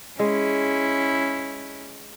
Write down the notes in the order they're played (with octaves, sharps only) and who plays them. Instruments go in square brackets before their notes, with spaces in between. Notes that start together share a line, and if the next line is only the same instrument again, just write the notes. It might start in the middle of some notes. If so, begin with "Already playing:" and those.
[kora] G#3 [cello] C#4 E4